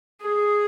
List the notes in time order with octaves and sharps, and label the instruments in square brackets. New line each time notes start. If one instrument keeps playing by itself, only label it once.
[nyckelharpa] G#4